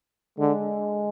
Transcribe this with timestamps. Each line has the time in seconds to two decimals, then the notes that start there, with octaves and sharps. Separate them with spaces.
0.39 D3 G#3